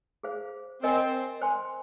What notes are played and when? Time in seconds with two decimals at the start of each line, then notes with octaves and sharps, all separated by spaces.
0.23 G#4 C5 F5
0.82 C4 A#4 D#5 G#5 C6
1.42 C5 G#5 C6